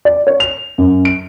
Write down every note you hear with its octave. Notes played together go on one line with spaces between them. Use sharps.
D5
C#5
F7
F#2
D7